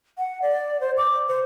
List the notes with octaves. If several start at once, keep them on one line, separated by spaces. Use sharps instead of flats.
F#5
D5
C5
D6
C5